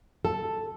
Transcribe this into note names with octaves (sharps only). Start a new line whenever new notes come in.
A4